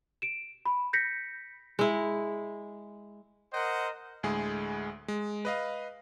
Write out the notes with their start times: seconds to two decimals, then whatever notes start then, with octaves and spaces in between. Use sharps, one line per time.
0.22 D7 E7
0.65 B5
0.93 G6 A#6 B6 C#7
1.79 G#3 E4
3.53 A#4 C5 D#5 F#5
4.23 D2 A2 G#3 G#4
5.08 G#3
5.45 B4 D#5 F5